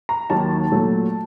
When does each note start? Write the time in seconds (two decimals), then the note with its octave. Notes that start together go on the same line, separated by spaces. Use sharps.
0.09 A#5
0.29 D#2 D#3 F#3 A#3 D#4 A5
0.71 A#2 F#3 A3